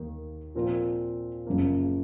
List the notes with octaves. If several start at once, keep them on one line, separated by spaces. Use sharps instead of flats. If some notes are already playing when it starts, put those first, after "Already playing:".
Already playing: D#2 D#3 A#3
A#2 F3 C4 F4 A#4
F#1 F#2 C#3 F3 A#3